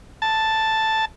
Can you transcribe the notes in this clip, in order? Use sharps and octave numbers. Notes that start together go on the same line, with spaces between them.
A5